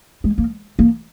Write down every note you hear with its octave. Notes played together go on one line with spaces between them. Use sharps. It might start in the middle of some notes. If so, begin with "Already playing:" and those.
G#3
A#3
A#3